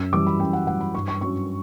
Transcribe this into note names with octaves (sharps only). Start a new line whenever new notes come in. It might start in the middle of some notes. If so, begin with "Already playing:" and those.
Already playing: F#2 E6
E3 G3 D6
B5
F#2 G5
F#5
E3 G3 F#5
B5
G2 C#6
C#6
F#3 C#4 C#6